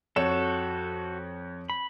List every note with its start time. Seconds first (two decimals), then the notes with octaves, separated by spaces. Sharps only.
0.16 F2 F#4 A4 C#5 E7
1.70 B5